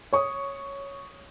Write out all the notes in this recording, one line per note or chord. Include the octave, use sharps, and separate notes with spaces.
C#5 C#6 D#6